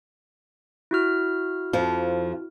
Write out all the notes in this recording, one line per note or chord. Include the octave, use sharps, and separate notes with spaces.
E4 F#4 F6
F2 F3